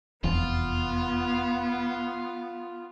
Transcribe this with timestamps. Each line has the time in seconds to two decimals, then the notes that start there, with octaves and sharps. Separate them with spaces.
0.24 F1 E2 B3 F4